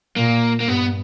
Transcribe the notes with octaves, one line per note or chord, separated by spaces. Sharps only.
A#2 A#3
A#3
G2 B3